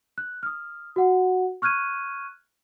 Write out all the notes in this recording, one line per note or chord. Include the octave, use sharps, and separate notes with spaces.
F#6
D#6 F6
F#4 F#5
C#6 F6 F#6 G#6 D#7